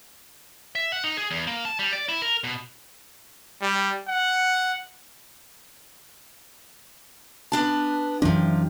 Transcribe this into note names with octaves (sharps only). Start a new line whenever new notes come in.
E5
F#5
D#4
G#4
E2
A#3
A5
G3
D5
E4
A#4
B2
G3
F#5
B3 D4 A5
F#2 C3 E3 F3 D4